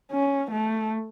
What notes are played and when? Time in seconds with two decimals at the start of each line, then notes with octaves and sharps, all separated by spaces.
0.11 C#4
0.51 A3